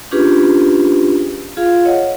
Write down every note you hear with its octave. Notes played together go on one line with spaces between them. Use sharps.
C#4 D4 F4 G4 G#4 B4
F4 G#4 F5
C#5 D#5 F#5